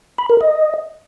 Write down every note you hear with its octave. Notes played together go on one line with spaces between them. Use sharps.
B5
A#4
D#5